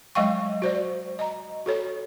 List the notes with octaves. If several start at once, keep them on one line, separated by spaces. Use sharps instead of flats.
F#3 G#3 D#5 F5 G5 C#6
F#4 C5 D5
D#5 A#5
F#4 A4 C#5